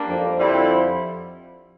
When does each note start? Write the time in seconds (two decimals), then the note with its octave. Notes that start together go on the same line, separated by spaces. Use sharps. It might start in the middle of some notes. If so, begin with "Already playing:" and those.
Already playing: G3 A#3 D4
0.08 F2 F3
0.38 D3 G3 C4 E4